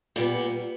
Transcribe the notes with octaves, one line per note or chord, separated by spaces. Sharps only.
A#2 G3 B3